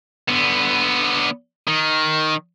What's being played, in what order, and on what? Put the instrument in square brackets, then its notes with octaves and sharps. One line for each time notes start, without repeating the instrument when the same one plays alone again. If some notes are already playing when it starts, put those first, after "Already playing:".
[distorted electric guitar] D3 B3
D#3